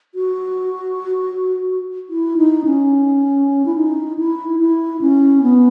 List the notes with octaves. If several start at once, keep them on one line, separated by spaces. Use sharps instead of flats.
F#4
E4
D#4
C#4
E4
D#4
E4
E4
C#4
B3